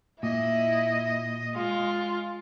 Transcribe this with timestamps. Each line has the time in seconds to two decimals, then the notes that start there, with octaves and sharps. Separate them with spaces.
0.23 A#2 E4 D#5
1.56 G#3 F4